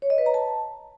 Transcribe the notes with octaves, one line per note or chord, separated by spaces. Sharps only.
C#5
D#5
B4
A#5
A5